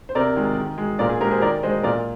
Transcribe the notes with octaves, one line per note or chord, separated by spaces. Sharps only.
C5
C3 A#4 D5
D#3 G#3
D#3
G#3
A#2 A#4 D5
G#4
G#3 G4 A#4
G#4 C5
D#3 A#4 D5
G#3 C5 D#5
A#2 A#4 D5